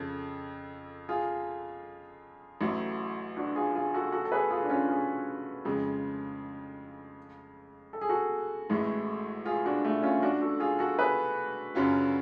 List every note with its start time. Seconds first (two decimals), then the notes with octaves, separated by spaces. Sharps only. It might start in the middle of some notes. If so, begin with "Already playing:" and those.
Already playing: F2 C#3 F3 A4
1.09 F4 G#4
2.61 A1 A2 F#3
3.37 D4 F#4
3.56 F4 G#4
3.75 F4 G#4
3.94 F#4 A4
4.12 F#4 A4
4.25 A4
4.32 G#4 B4
4.51 F4 G#4
4.63 D4
4.69 C#4 F4
4.89 F4 G#4
5.65 F2 C#3 G#3
7.93 A4
8.01 G#4
8.09 F#4 A4
8.70 A1 A2 G#3
9.46 F4 G#4
9.66 D4 F#4
9.85 A3
10.03 C#4 F4
10.22 D4 F#4
10.41 F#4 A4
10.60 F4 G#4
10.79 F#4 A4
10.99 G#4 B4
11.75 F#2 C#3 F#3 C#4 F4